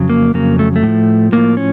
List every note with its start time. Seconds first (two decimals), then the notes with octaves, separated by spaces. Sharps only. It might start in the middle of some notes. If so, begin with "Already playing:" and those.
Already playing: F2 C#3 F#3
0.10 A#3
0.34 F2 C#3 F#3 A#3
0.59 A3
0.76 A3
0.83 A2 F3
1.32 A2 F3 A#3
1.57 C#4